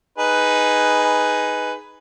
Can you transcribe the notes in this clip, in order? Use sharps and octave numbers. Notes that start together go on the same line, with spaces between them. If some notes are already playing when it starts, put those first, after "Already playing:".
D#4 G#4 B4